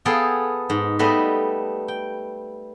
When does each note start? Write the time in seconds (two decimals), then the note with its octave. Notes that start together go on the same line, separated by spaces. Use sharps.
0.05 B3 G#4 A4 F5 G5
0.70 G#2
0.99 G3 A3 B3 B4 D#5
1.88 G5